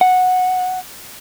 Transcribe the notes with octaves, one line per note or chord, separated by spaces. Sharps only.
F#5